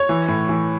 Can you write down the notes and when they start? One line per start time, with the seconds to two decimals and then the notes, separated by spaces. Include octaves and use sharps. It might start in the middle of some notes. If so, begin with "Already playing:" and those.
Already playing: C#5
0.09 E3
0.28 A2
0.49 E3